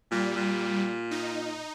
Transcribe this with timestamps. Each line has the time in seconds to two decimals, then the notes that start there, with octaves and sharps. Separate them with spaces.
0.11 A#2 G3
0.36 A#2
1.11 D#4